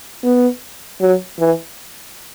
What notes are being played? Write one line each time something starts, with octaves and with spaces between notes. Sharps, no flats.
B3
F#3
E3